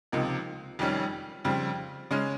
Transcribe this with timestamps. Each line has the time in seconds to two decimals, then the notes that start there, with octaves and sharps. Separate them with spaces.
0.12 C#2 C3 F3 A#3 D#4
0.79 F1 F2 D#3 G3 C#4
1.45 F2 C#3 G3 C4
2.11 C#3 G#3 C#4 G#4